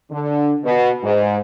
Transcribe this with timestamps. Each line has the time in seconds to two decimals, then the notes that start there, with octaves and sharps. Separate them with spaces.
0.11 D3
0.65 B2
1.04 G#2